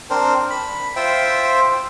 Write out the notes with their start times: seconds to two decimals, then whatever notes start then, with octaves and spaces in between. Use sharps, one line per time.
0.10 C4 D4 A#4 C5
0.50 B5
0.96 F4 C5 E5 G5